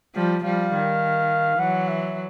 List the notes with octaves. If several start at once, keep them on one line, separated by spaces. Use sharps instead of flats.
F3 G3
F3 G3 F5
D#3
E3 F#3 F#5
E5